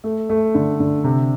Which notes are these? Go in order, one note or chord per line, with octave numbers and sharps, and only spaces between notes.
A3
A3
D3
D3
C3